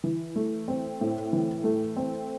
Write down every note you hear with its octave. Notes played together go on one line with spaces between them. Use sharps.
E3
A3
C4
A2
E3
A3
C4